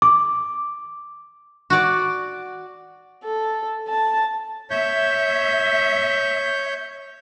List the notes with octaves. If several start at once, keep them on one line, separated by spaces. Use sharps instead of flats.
D6
F#4 D5
A4
A5
C#5 E5 G6